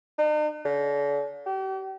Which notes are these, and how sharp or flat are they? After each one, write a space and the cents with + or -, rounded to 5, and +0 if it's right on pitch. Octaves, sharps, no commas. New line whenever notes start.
D#4 -45
D3 -45
G4 -40